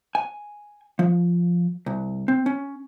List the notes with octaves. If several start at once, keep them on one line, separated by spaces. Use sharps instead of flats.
G#5
F3
C2
C4
C#4